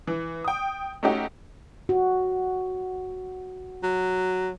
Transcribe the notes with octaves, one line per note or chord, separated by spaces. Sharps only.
E3
G5 D#6
A3 C#4 D#4 F#4 G4
F#4
F#3